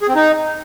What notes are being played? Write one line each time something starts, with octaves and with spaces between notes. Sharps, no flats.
G#4
C4
D#4